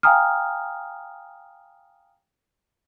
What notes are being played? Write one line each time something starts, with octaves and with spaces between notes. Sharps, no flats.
F5 G5 G#5 A#5 D#6 F6